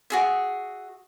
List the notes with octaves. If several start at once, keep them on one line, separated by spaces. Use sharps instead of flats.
F#4 G#4 E5